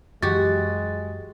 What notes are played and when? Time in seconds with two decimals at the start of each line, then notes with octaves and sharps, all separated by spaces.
0.23 F#2 E3 G#3 F#4 G4 A6